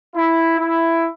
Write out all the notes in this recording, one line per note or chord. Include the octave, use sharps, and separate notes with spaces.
E4
E4